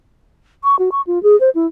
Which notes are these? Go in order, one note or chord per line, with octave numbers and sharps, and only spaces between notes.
C#6
F#4
C#6
F4
G#4
C5
E4